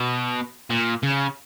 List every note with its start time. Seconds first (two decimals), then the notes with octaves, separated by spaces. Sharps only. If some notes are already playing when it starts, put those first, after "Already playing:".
Already playing: B2
0.70 A#2
1.03 C#3